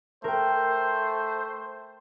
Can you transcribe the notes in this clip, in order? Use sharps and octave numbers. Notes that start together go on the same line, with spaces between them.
A3 A#4 C5 G5